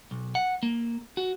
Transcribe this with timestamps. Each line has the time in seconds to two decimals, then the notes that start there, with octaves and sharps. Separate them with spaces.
0.11 B1
0.35 F#5
0.63 A#3
1.17 F#4